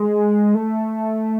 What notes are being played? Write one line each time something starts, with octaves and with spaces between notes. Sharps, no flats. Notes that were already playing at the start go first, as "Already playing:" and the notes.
Already playing: G#3
A3